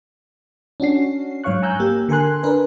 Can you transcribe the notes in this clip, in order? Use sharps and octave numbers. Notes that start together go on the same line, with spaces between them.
C#4 D4 F#4 C7
G#2 F#3 C#5 F5 C#6 F#6
G#5 A#5 E6 F#6 G6
A#3 G4
D3 A4 A#4 G#5 C6 F#6
D4 A#4 B4